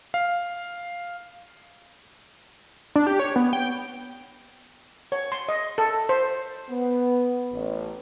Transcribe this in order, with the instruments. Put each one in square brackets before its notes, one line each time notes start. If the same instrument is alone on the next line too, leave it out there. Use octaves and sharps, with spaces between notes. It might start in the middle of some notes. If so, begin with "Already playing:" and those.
[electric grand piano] F5
[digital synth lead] D4
G4
C#5
B3
G5
[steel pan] C#5
C6
D#5
A4
C5
[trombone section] B3
A1